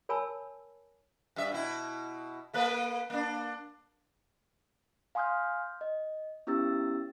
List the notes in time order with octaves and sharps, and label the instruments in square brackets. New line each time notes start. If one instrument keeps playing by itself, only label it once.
[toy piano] A#4 C#5 G#5 A5 B5 E6
[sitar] G2 E5
B2 E4
A3 A#3 B4
A#3 D4
[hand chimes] F5 G#5 C6 D#6 F6 G6
D#5
B3 C#4 E4 G4 E6 A6